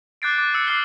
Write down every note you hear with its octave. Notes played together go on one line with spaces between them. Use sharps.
D6 F#6 G6 A6 C7 D7
D6
E6 C#7
D6 F6 F#6 C7 G7